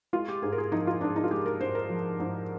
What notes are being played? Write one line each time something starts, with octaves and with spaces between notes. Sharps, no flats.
G#3 F4
G4
G#2 G#4
A#4
G#4
F3 D#4
F4
G#2 D4
D#4
F4
G#3 G4
A#4
G#2 C5
A#4
F3
G#2